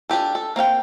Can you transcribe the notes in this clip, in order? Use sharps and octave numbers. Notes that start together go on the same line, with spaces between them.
D4 F4 G4 A4
A4
A#3 C4 F5 G5